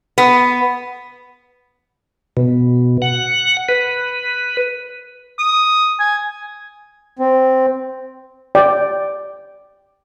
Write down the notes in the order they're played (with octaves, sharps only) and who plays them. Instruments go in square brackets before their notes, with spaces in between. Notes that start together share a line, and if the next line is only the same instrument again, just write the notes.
[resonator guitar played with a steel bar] B3
[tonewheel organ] B2
F#5
B4
[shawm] D#6
G#5
[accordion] C4
[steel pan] D5 G5